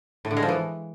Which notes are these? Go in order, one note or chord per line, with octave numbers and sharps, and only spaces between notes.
A2
D3
G#3
F3
E3